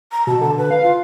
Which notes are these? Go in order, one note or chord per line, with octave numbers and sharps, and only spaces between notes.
A#5
B2 A5
D3 A5
B4
F5
F4